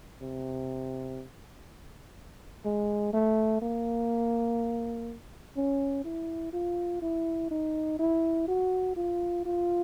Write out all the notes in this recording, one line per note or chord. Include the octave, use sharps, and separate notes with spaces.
C3
G#3
A3
A#3
C#4
E4
F4
E4
D#4
E4
F#4
F4
F4